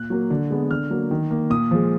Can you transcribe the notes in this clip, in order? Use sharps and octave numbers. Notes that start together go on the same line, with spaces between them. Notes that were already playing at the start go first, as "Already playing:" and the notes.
Already playing: A#2 F#6
F#3 A#3
D3
G#3 B3
D3 F6
F#3 A#3
D#3
A#3
A#2 D#6
F3 G#3